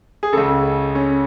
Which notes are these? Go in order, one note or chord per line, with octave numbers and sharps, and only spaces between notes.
G#4
C#2 C#3 A4
C#4